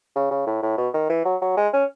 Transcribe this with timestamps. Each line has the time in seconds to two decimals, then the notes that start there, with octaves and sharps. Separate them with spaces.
0.16 C#3
0.31 C#3
0.47 A2
0.62 A2
0.78 B2
0.94 D#3
1.09 E3
1.25 F#3
1.41 F#3
1.57 G#3
1.73 C#4